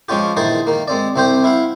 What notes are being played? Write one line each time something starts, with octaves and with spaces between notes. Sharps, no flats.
F3 G#3 C#4 F4 G4
A#1 D#3 E3 G#4 C5 A5
D#3 A#3
G#3 C4 D5
C2 C3 C4 G4 C5 G5
E4 F5 F#5